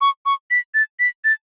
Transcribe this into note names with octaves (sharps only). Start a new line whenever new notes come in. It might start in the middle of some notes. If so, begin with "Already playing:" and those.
C#6
C#6
B6
A6
B6
A6